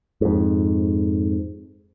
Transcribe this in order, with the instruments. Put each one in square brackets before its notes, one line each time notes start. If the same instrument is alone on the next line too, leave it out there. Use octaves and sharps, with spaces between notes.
[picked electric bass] F2 G#2